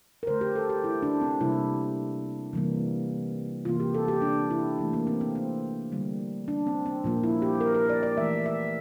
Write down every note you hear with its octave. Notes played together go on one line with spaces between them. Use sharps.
A#4
D3 A3 C5
G4
A4
G4
E4
D4
C4
C3 G3 A#3 E4
C3 E3 G3 A#3
C3 E3 A#3 F4
G4
A4
G4
D4
E4
E3 A3
A#3
C4
C4
C4
D3 G3 A#3
D4
C4
C4
A#2 F3 A#3
E4
G4
A#4
A#4
D5
D5
E3 A3 E5
E5